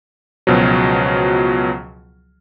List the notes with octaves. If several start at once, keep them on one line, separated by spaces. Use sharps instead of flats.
C#2 B2 F3 F#3